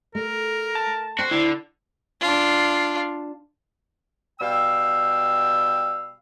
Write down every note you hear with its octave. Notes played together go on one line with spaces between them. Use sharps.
A3 A#4
A5
F#4 C5 G5 C6
D3 E4
D4 F4
B2 G3 F5 G5 E6